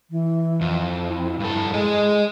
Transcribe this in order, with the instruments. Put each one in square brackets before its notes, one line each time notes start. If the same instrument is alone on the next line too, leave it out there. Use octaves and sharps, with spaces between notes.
[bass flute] E3
[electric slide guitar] F2
[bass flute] E4
[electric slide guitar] G2 A4
[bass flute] G#3 [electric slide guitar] G#4 D#5